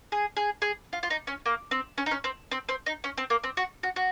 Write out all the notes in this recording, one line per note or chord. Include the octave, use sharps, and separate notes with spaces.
G#4
G#4
G#4
F4
F4
D#4
C#4
A#3
C4
C#4
D#4
C#4
C4
C4
C4
D#4
C#4
C4
A#3
C4
F#4
F#4
F#4